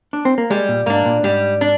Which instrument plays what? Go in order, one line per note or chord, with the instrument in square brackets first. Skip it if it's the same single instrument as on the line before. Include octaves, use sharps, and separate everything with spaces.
[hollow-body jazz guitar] D4
C4
A#3
[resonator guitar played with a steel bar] G3 [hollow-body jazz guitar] G#3
[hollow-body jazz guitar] A#2
[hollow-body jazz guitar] G#2 [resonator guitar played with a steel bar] A#3 D4
[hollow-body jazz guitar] A#2
[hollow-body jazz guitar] G#2 [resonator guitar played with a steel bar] G3
[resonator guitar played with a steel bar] D4